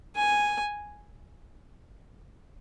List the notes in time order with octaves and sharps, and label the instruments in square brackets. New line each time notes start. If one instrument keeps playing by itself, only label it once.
[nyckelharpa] G#5